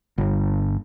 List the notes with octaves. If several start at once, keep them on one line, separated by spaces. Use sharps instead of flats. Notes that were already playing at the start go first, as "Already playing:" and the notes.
G1